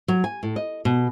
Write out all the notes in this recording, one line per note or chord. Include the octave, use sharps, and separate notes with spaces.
F#3
G#5
A2
D#5
B2